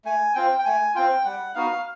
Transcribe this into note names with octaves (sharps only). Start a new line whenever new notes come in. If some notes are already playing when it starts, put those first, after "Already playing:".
A3 G#5
C4 F4 G5
G5
A3 G#5
C4 F4 G5
G3 F#5
B3 D#4 F#4 F5